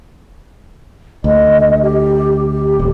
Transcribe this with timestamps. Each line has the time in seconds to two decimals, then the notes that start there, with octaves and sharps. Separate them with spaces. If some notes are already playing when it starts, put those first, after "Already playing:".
1.24 D2 D#5
1.82 G4
2.50 G4
2.79 D#1